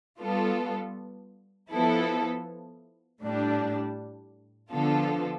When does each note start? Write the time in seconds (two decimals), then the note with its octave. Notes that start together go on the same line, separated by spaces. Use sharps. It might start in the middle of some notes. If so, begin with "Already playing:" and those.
0.19 G3 B3 F4 A4
1.71 F3 B3 E4 A4
3.21 A2 G3 D4
4.72 D3 F3 B3 F4 A4